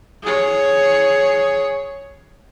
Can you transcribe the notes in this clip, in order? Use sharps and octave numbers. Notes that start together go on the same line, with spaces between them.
G#4 C#5